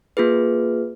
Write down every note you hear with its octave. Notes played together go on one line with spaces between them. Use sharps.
A#3 F4 G#4 B4